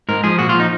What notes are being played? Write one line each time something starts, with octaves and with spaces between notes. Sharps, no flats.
G#2 A#4
F3 G#4
A#2 F#4
F4
F3
D#4